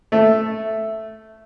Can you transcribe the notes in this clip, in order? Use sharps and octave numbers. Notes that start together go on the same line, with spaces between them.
A3